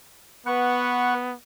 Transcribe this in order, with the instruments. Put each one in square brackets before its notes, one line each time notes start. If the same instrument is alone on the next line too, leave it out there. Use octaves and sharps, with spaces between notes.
[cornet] B3 [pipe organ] B4 F#5 C#6